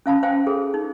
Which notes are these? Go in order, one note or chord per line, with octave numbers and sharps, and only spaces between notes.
C#4 F5 A5 B5
C5 F5 G5 G#5
G#4 A4 C5
D#4